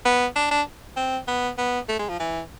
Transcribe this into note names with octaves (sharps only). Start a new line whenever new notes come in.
B3
D4
D4
C4
B3
B3
A3
G#3
F3
E3